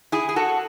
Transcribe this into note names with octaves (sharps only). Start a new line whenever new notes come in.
E4 G#4
G#4
F#4 A4